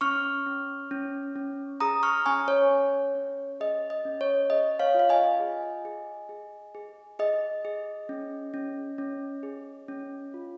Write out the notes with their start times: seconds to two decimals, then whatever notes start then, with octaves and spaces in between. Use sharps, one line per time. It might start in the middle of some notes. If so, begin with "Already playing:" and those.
0.01 C#4 C#6 F6
0.46 C#4
0.91 C#4
1.36 C#4
1.80 G#4 A#5 D#6
2.03 C#6 F6
2.26 C#4 G#5 C#6
2.48 C#5
2.71 C#4
3.15 C#4
3.60 G#4 D#5
3.90 D#5
4.05 C#4
4.21 C#5
4.49 G#4 D#5
4.79 C#5 F5
4.94 F4
4.99 F5
5.09 D#5 G#5
5.40 G#4
5.85 G#4
6.29 G#4
6.75 G#4
7.19 G#4 D#5
7.65 G#4
8.09 C#4
8.54 C#4
8.98 C#4
9.43 G#4
9.88 C#4
10.34 F4